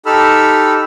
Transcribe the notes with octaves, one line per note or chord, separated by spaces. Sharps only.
D#4 G4 A4 B5 E6 F6